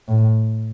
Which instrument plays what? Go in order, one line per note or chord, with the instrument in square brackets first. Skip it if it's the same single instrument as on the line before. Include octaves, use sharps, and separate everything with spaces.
[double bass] A2